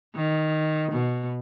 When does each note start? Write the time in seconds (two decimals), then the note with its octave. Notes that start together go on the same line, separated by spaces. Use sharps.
0.15 D#3
0.91 B2